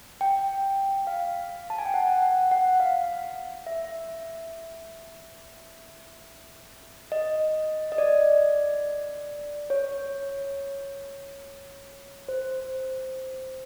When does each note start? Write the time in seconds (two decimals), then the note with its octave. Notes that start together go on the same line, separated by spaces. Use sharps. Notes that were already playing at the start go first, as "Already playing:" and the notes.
0.21 G5
1.07 F5
1.70 A5
1.78 G#5
1.85 G5
1.94 F#5
2.22 F#5
2.51 F#5
2.80 F5
3.67 E5
7.12 D#5
7.92 D#5
7.98 D5
9.70 C#5
12.28 C5